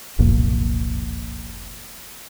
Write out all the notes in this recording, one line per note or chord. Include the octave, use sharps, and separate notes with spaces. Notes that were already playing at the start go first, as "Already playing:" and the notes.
F#1 C2 F2 A#2